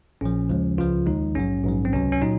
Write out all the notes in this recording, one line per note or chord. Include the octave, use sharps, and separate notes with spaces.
A#1 A#2 F3 C#4
D#2 C#3 F3 G#3
C#2 C#3 F3 F4
D#2 D#3 G#3 D#4
A#1 G#2 F#3 C#4
A#1 G#2 F#3
C4
C#2 C3 F#3 C#4
C#4
A#2 F#3 D#4